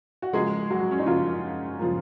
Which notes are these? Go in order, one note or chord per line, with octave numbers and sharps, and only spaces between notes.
F#4
C#3 F3 G#3 A#3 G#4
F#3 F#4
C#4
D#4
C#3 F3 A#3 F4
C#3 F3 A#3